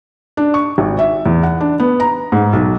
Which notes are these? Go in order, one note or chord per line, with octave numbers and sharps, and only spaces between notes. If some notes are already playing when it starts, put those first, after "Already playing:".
D4
C#6
G#1
E5
E2
F#5
D4
B3
A#5
G#2
B1